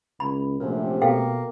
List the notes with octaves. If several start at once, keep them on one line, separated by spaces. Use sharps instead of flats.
C#2 B5
A#1 F#2 C3 A3
B2 A#3 A4 F5 G5